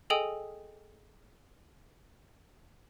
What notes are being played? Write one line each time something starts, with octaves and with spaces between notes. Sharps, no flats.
G#4 A4 D#5 G5 G#5 D#6